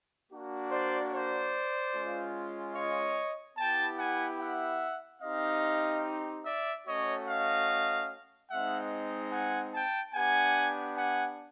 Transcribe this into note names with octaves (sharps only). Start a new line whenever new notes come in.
A#3 D4 F#4
C5 D5
C5 D5
G#3 C#4 F4
C#5 D#5
B3 E4 G4 G5 A5
F#5 G#5
E5 F#5
C4 D#4 G4 D#5 F5
D5 E5
A3 C#4 F#4 C#5 D#5
D#5 F5
G#3 C4 D#4 E5 F#5
F#5 G#5
G5 A5
B3 D4 G4 F#5 G#5
F#5 G#5